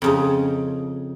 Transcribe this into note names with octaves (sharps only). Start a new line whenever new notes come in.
F2 C#3 D#4